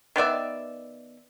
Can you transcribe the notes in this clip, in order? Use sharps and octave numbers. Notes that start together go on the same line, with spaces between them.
D#3 B3 D5 E5